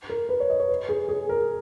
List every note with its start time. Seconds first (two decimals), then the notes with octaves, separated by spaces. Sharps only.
0.09 A#4
0.29 B4
0.40 C#5
0.50 D#5
0.60 C#5
0.69 B4
0.89 G#4
1.09 G#4
1.29 A#4